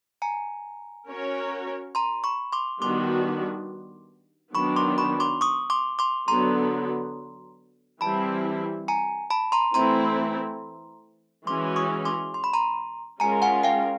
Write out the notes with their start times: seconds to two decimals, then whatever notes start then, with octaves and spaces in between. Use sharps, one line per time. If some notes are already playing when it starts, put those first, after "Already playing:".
0.22 G#5 A#5
1.09 C#4 F#4 A#4 C#5
1.95 A#5 C6
2.24 B5 C#6
2.53 C6 D6
2.82 D#3 G3 B3 D4 F#4 C6 D6
4.54 D#3 F#3 B3 D4 B5 C#6
4.76 C6 D6
4.98 B5 C#6
5.20 C6 D6
5.41 C#6 D#6
5.70 C6 D6
5.99 C6 D6
6.28 D3 F#3 B3 A#5 C6
8.01 E3 G3 C4 E4 A5 B5
8.88 G#5 A#5
9.30 A5 B5
9.52 A#5 C6
9.74 E3 A3 C4 E4 A#5 C6
11.47 E3 G#3 C#4 F#4 C6 D6
11.76 C#6 D#6
12.05 C6 D6
12.34 C6
12.44 B5
12.53 A#5 C6
13.20 G#3 C#4 F4 A#4 G#5 A#5
13.42 F#5 G#5
13.63 F5 G5